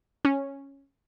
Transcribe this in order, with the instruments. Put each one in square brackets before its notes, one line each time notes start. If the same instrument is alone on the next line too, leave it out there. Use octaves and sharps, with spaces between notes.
[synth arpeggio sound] C#4